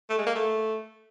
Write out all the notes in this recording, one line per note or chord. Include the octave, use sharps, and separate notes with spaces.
A3
G#3
A#3
A3